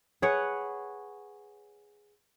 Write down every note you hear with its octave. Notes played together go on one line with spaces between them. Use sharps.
G#4 B4 C#5 F#5